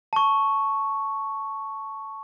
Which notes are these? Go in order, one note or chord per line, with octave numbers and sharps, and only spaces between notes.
A5 C#6